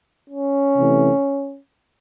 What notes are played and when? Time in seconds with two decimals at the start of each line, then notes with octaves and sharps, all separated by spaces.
0.29 C#4
0.76 C3 E3 A3